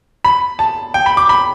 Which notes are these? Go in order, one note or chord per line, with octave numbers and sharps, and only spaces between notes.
B5
A5
G5
B5
D6
B5